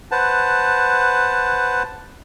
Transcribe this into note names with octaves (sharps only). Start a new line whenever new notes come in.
B4 C5 F#5 A5